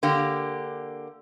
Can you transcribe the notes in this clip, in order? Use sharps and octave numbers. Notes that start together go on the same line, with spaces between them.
D3 A#3 G4